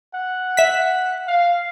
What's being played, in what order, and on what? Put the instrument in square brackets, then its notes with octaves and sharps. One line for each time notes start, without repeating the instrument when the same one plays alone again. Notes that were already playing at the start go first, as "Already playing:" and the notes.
[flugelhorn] F#5
[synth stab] E5 B6
[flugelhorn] F5